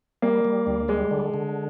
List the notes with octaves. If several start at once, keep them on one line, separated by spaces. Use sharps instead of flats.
G3 A#3
G3
D2
G3 G#3
D3
D3